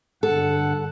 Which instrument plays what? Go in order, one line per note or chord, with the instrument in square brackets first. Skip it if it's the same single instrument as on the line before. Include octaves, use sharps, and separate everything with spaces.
[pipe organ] G2 D3 F#5 [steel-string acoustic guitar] A4